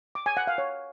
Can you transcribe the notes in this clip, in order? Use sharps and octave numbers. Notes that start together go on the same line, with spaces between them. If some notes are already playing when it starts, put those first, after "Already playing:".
D6
G#5
F#5
F5
C#5